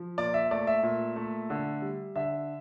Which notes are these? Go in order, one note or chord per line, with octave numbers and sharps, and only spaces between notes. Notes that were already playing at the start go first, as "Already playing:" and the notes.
Already playing: F3
A#2 D5
E5
A3 D5
E5
A#2
A3
D3
G3
D3 E5